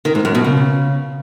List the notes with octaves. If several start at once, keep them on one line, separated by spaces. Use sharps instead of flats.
D#3
G#2
F#2
B2
C#3